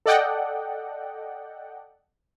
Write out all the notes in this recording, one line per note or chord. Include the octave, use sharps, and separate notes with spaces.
A4 D5 D#5 F#5 G5